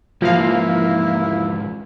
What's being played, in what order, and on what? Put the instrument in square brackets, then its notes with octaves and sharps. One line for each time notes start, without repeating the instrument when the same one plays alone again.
[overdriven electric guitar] G#2 E3 [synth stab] F3 F5 [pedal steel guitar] A#3 [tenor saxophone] E4